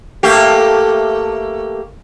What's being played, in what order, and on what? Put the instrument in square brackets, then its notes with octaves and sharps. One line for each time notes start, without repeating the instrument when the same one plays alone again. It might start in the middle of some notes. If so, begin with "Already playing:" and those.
[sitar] A3 A#3 G4